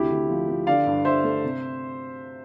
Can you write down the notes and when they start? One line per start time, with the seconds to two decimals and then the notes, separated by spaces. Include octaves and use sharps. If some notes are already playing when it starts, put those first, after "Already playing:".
Already playing: D2 C3 E4 G4
0.10 D2
0.29 F3
0.48 F3
0.67 D3 D5 F5
0.86 G2
1.05 G2 C5 E5
1.24 A3
1.44 C3